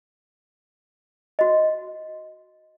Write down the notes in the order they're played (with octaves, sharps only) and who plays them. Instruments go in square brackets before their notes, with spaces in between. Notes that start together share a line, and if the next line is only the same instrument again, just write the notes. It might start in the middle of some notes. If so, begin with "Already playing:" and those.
[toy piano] F#4 D#5